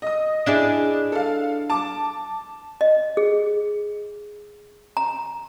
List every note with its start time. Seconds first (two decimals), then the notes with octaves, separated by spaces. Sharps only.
0.02 D#5 D#6
0.46 D4 E4 G#4
1.12 A4 F5
1.70 A5 D6
2.81 D#5
3.17 G#4
4.97 A#5